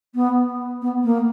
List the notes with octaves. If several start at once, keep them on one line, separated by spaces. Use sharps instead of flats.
B3
B3
A#3